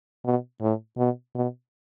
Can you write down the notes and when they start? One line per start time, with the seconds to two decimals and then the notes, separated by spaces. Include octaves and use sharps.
0.25 B2
0.61 A2
0.98 B2
1.35 B2